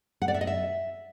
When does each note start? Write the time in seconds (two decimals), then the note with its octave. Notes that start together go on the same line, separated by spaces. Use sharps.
0.22 F#5
0.28 D5
0.34 E5
0.41 D#5
0.47 E5